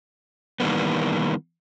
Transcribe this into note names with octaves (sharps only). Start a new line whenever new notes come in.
D#3 E3 G3 A#3 B3